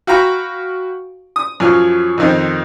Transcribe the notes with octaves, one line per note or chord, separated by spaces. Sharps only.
F#4 F5 G5 A#5 B5 C#6
D#6
F#2 F3 C#5 F6
F2 D#3 C4